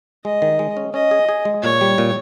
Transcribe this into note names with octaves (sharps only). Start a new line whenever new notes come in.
G#3 D#5
D#3
G#3
C#4
C#4 D#5
G#4
G#4
G#3
A#2 C#5
G3
A#2